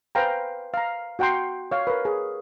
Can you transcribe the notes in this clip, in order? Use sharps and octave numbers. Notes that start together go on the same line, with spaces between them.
B4 C5 F5 G5 G#5 A#5
F5 A#5
F#4 F#5 G5 A#5 C6
C#5 F5
A#4 B4
G#4